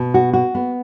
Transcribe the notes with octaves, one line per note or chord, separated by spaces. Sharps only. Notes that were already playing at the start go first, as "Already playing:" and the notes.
Already playing: B2
F#4
F#4
B3